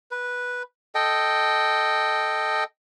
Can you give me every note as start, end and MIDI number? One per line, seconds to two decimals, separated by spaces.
0.11 0.63 71
0.95 2.64 69
0.95 2.64 75
0.95 2.64 79